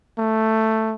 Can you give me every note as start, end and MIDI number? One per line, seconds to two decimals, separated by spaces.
0.18 0.95 57